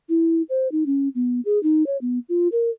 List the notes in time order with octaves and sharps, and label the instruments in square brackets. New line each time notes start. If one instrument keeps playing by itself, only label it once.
[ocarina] E4
C5
D#4
C#4
B3
G#4
D#4
C#5
B3
F4
A#4